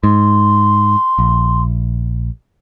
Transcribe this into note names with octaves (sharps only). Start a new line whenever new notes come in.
G#2 C6
A#1